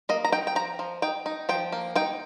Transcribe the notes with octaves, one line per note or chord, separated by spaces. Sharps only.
A#3 D#5
A#5
D#4 G5
G5
F3 A#5
F3
D#4 G5
D#4
F3 G5
A#3
D#4 G5